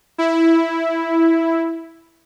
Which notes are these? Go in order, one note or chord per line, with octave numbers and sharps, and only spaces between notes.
E4